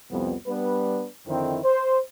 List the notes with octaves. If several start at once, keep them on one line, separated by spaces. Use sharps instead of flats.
C2 F2 B3
G3 B3 D4 B4
F2 D3 D#3 C4 D#4 E4
C5